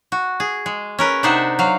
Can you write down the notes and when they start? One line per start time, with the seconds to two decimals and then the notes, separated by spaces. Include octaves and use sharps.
0.12 F#4
0.40 G#4
0.66 G#3
0.99 C#4 A#4 B4
1.23 C3 D4 D#4 C5 E5 F#5
1.59 F#3 F5